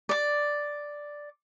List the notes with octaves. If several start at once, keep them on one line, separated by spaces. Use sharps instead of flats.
D5 D6